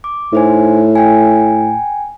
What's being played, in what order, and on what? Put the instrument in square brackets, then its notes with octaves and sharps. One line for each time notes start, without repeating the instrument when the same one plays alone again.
[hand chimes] D6
[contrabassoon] A2 [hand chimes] D#4 C5 G#5
[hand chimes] G5 G#5